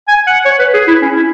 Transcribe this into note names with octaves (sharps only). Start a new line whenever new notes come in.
G#5
F#5
C#5
B4
G#4
E4
C#4
E4